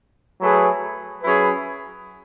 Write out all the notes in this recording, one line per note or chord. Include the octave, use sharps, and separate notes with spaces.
F#3 A3 E4 G#4 B4
F#3 C#4 E4 G#4 B4